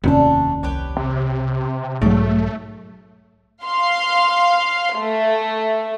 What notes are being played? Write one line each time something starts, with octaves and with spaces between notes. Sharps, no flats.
F1 D#2 C3 A3 C#4 D4
C2 G4 B4 C#5
C3
B1 G#2 C#3 F#3 A3 G4
F5 C6
A3